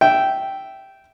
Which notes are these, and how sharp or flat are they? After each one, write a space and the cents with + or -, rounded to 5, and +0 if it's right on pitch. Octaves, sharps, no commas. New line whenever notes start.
E5 +0 G5 -10